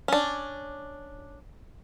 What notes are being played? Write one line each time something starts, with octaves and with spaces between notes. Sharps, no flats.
C#4 D4